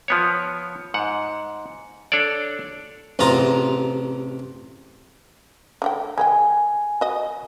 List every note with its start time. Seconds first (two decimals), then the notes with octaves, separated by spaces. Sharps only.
0.08 F3 B3 C#5
0.94 G#2 F#5
2.12 D4 A4 C#5 D5
3.19 A1 E2 C3 F4 A#5 D#6
5.82 D3 A3 G5
6.18 G#3 B4 G5 G#5
7.01 F#4 D#5